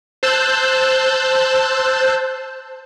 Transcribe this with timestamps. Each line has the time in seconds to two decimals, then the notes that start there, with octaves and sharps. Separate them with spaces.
0.23 C5 A5 E6 F#6 G6